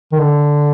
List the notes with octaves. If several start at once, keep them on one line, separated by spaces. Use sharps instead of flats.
D#3
D3